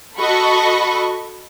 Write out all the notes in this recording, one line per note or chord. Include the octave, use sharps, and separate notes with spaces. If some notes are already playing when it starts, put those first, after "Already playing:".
F#4 A4 D#5 B5 C#6